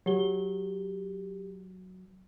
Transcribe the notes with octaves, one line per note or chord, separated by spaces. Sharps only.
F#3 G4 G7